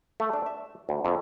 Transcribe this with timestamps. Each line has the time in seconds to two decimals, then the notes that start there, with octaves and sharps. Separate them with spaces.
0.20 A3
0.34 D4
0.46 E5
0.89 D2
1.05 F2